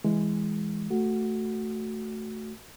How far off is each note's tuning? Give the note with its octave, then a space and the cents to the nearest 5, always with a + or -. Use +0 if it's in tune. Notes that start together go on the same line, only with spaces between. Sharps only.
E3 +0 G#3 +0
A3 +0 F#4 +0